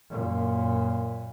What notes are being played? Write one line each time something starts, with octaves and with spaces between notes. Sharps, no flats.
F#2 A#2